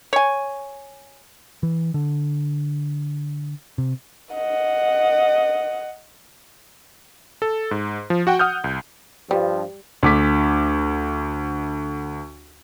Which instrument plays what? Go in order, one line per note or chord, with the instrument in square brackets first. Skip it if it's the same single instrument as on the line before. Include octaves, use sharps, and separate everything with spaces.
[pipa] C#5 G#5
[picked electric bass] E3
D3
C3
[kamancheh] D#5 F#5
[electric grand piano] A4
G#2
F3
F#4 F#5 G5
F#5 D#6 F6 G6
C2
[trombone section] G2 F3 [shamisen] G3
[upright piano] D2 D6 B6